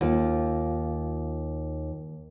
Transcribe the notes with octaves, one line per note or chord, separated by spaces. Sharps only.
D#2 F4